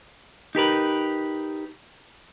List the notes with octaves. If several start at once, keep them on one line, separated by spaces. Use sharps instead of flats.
D#4 G4 A#4 B4